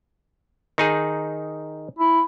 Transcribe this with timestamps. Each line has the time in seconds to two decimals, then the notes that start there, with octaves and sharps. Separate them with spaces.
0.78 D#3 D#4 G#4
1.98 E4